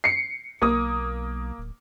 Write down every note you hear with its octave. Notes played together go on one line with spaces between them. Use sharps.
C7 C#7
B1 A#3 D#6
D1